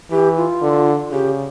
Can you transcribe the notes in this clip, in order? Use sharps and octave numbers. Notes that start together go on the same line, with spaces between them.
E3 G4
F4
D3
C#3 G4